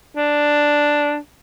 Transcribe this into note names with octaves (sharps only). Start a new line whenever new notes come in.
D4